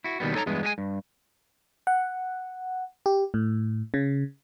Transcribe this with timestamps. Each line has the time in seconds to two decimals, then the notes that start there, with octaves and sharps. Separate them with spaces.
0.04 E4 F#4
0.20 D#2 B2 D#3 G3 B3
0.34 D#4 A4 C#5 G#5 A#5
0.46 E2 G2 G#3 B3
0.63 G#3 G4 G#5
0.78 G2
1.87 F#5
3.06 G4
3.34 A2
3.94 C#3